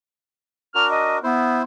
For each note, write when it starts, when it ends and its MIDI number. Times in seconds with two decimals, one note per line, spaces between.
0.75 1.19 62
0.75 1.19 66
0.75 1.19 70
0.75 0.86 89
0.91 1.17 75
1.23 1.64 59
1.23 1.63 64
1.23 1.63 72